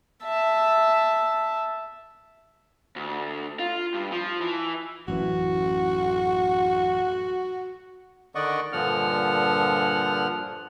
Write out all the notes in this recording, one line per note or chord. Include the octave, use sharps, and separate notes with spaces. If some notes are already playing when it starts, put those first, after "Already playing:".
E5 A5
D2
F4
G2
F3
E3
A1 F#2 E3 F#4
D3 D#3 D5 D#5 F#5 C#6
G2 A#2 D3 F3 F#5 F6